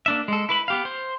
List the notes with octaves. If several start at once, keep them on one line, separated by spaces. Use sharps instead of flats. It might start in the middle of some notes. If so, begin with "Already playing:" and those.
A#3 D4 E5
G#3 A4
E4 B4 B5
B3 G4 F5
C5